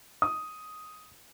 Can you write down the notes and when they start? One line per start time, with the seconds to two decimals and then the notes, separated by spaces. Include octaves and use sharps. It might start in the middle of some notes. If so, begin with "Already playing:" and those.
0.22 D#6